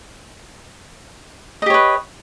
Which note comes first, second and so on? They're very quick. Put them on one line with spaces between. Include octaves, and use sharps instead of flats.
D#5 G4 C#5 B4